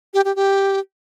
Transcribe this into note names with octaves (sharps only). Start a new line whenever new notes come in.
G4
G4
G4